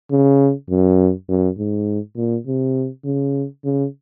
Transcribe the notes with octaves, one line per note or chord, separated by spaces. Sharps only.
C#3
F#2
F#2
G#2
A#2
C3
C#3
C#3